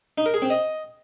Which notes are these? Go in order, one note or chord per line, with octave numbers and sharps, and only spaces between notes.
D#4
A#4
G#4
C4
D#5